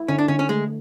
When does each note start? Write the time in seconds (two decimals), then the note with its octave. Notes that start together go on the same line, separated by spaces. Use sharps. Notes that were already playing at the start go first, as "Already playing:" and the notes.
Already playing: E4
0.08 D3 C#4
0.18 D4
0.28 D3 C#4
0.39 C#4
0.49 G#3 A3